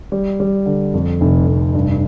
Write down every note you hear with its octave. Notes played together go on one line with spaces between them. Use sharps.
G3
G3
D3
F2
F1
F1
G2